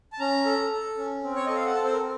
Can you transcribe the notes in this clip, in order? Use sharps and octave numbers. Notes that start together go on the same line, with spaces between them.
A5
C#4 A#5
A4
A4
C#4
C4
C#5
A4 D#5
F5
F#5
C4 A5
C5
A#4
C4